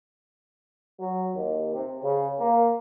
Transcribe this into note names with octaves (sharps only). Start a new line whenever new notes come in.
F#3
D#2
C3
C#3
A#3